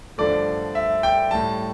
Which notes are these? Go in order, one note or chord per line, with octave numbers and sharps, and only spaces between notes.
G2 D3 F3 A3 D5
E5
G5
A2 G3 A5